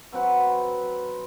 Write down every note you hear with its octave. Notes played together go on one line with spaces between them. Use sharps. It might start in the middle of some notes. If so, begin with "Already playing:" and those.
F#3 C4 F#4 B4